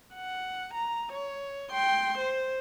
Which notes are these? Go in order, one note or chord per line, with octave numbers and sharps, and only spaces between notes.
F#5
A#5
C#5
G5 C6
C5